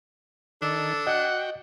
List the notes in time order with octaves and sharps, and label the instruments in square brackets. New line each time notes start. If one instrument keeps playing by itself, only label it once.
[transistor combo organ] D#3 [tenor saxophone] D4 [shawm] A4
[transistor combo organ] F#4 G5 [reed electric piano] D#5 [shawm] F#5